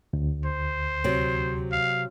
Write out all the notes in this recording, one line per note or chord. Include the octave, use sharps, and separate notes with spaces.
D2
C5
C3 F#3
F5